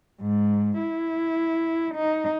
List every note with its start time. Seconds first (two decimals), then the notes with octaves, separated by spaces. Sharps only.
0.21 G#2
0.79 E4
1.95 D#4